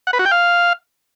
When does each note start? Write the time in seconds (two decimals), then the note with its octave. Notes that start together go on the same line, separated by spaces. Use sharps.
0.07 F#5
0.13 B4
0.19 F#4
0.25 G5
0.31 F5